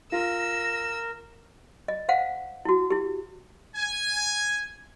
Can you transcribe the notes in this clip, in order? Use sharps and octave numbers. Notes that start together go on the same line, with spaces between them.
F4 A#4 E6 A#6
D#5
C5 F5 F#5
E4 F#4
E4 G4
G#5